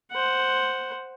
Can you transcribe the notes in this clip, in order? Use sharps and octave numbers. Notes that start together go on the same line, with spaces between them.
C5 F#5